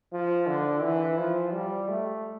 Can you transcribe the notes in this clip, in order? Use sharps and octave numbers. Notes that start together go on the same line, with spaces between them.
F3
D3
E3
F3
G3
A3